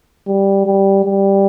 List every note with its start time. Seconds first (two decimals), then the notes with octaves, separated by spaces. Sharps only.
0.27 G3
0.65 G3
1.04 G3